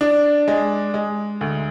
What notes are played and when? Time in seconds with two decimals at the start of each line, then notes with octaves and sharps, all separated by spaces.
0.01 D4
0.48 G#3
0.94 G#3
1.41 D2